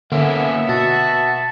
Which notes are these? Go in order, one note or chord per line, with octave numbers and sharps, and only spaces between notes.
D3 A#3 B3 C#4 E5
B2 F#4 A5